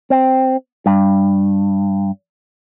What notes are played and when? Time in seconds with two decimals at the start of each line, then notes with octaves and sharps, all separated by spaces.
0.10 C4
0.86 G2